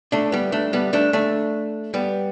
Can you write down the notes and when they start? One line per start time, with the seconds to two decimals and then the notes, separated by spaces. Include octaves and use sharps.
0.12 A3 D4
0.32 G3 B3
0.52 A3 D4
0.73 G3 B3
0.93 A3 D4
1.13 A3 D4
1.94 G3 B3